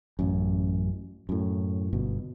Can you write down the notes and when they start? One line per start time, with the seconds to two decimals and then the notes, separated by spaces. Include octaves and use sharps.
0.19 A1 F#2
1.29 F#2 A2
1.93 G1 B2